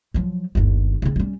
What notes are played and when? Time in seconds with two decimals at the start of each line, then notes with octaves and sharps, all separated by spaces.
0.14 F3 F#3
0.55 G1 D#2
1.02 C#3 C4
1.16 G3 C#4